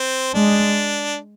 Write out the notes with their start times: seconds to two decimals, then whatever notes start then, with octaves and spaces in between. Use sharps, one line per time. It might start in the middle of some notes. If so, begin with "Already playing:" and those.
Already playing: C4
0.34 G#3 D4